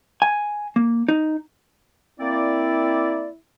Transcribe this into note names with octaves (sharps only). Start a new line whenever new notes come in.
G#5
A#3
D#4
A#3 C4 E4 D5